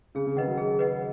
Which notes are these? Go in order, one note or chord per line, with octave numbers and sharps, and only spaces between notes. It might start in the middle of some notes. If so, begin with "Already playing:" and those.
C#3 G#4
C#3
D#3 B4 D#5 F#5
F#3
G#4
B4 D#5 F#5